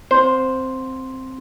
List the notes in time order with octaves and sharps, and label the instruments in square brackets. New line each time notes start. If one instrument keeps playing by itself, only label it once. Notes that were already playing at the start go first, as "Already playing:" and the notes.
[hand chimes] C4 E4 C6 [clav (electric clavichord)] C5